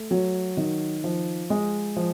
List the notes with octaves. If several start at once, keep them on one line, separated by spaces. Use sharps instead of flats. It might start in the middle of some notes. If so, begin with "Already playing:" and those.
Already playing: A3
F#3
D#3
F3
G#3
F3